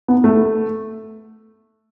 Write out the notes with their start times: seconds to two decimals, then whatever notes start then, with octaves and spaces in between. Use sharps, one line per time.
0.08 B3
0.24 A3